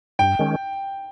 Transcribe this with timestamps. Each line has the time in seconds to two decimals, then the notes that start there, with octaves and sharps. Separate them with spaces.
0.19 G2 G5
0.39 D#3 G#3 C#4